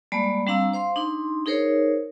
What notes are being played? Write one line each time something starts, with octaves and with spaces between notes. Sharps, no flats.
G3 G#3 A#3 D5 A5 B5
G3 C4 D4 F5 A#5 E6
C5 F5 C6
D4 D#4 C6
D#4 G#4 A#4 C5 C#5